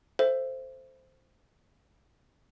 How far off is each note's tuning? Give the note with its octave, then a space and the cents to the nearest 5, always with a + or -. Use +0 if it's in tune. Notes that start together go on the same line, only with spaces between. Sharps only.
A4 +5 C5 +0 E5 +20